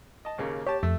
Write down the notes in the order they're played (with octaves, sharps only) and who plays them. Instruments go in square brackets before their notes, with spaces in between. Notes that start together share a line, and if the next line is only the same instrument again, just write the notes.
[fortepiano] D#5 A5
D#2 C#3 A#3
[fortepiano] G4 A5 [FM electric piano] C#5
[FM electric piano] F2 [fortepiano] A3